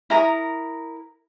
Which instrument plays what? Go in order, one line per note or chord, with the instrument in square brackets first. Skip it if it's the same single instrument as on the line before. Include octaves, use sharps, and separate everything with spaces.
[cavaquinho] E4 A#4 A#5 D#6